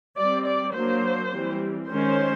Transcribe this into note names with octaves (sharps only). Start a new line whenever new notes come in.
G3 C4 D5
D5
F#3 A#3 D4 C5
E3 G3 C4
D#3 G#3 C#4 C5